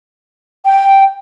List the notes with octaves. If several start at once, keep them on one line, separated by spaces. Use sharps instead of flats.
G5